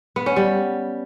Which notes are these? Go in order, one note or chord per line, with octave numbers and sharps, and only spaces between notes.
B3
C#4
G3